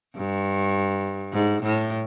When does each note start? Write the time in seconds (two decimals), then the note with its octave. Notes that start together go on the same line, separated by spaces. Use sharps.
0.16 G2
1.33 G#2
1.63 A2